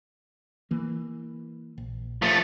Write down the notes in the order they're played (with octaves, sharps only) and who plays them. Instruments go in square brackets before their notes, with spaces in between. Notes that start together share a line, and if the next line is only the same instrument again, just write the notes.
[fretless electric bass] E3 A#3
A#1
[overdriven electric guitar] F3 A3